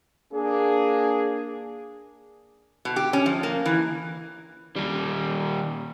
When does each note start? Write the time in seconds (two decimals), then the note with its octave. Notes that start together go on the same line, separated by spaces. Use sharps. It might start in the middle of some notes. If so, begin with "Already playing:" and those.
0.33 A#3 D4 G#4
2.85 B2
2.96 G4
3.13 C#4
3.26 F3
3.43 A#3
3.66 E3
4.76 D#2 G3